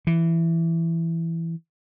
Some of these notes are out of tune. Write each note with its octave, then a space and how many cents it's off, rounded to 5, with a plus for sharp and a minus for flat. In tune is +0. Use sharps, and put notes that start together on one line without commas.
E3 +10